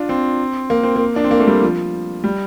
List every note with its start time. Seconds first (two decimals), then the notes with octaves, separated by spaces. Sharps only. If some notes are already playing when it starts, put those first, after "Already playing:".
Already playing: D4 F4
0.09 C4
0.70 A#3
0.83 C4
0.96 A#3
1.16 D4
1.24 C4
1.31 A#3
1.40 A3
1.48 G3
1.62 F3
2.24 G3